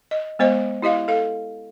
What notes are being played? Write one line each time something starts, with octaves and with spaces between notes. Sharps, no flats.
D#5
G#3 B3 C5 D#5
E4 G4 D#5 F5
A4 F5